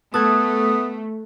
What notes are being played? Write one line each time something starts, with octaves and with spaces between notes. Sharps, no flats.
A3 B3 A4 D#6 F#6 G#6